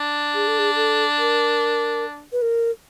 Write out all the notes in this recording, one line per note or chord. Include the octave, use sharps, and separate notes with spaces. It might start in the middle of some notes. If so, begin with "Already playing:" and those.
Already playing: D4
G#4
A4
G#4
A4
A#4
B4
A#4